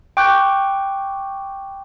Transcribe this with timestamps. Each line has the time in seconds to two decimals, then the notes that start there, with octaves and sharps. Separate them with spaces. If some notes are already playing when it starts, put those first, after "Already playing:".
0.17 G5 C#6 D6 F#6 G6